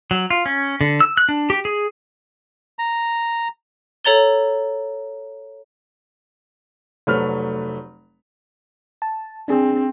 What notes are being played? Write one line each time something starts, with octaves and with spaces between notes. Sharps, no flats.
F#3
F4
C#4
D3
E6
F#6
D4
G4
G#4
A#5
A4 C#5 A#5 A6 G7
F1 F#3 A3 B4 C5 F6
A5
C4 D4 G#4